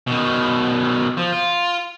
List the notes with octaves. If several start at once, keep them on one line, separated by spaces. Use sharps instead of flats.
B2 D#3
F3
F4